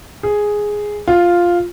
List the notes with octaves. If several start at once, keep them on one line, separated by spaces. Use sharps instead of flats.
G#4
F4